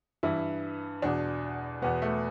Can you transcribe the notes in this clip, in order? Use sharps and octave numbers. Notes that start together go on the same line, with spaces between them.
G2 E3 E4
E2 B2 D4
E2 B2 B3
A3